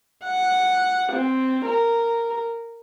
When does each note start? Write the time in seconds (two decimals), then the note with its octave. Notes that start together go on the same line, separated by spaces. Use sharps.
0.24 F#5
1.12 C4
1.65 A#4